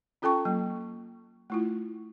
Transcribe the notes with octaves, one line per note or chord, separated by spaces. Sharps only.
C#4 F4 A4 G5 A5 C#6
F#3 A#3
A3 E4 F4